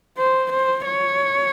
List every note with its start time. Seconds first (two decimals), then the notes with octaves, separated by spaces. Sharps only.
0.18 C5
0.51 C5
0.86 C#5